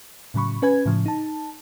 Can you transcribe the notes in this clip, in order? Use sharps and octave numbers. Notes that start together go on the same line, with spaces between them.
A2 C#3 F#3 B5 C#6
C#4 B4 G#5 G#6
A2 C#3 F3
D#4 A5